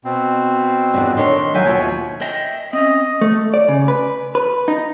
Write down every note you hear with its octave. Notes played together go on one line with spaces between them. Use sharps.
B2 C4
E2 G2
D#3 D4 C#5 C6
F#3 E5 G5 G#5
D#2 B2 F3 C#5
D#5 E5 G5
C4 C#4 D#5
A3
D5
C#3
B4
B4
D#4